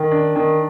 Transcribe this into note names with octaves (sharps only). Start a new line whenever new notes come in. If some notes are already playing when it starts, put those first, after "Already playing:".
Already playing: D#3
D4
D#3